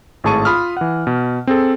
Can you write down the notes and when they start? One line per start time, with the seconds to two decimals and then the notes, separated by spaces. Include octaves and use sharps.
0.24 G#1 A2 G#4 A5 C#6 D#7
0.45 F4 B5 D#6 F6
0.77 E3 F#5
1.07 B2
1.47 C4 G#4 A4